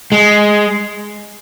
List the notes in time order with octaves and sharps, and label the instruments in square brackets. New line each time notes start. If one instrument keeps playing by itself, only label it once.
[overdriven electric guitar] G#3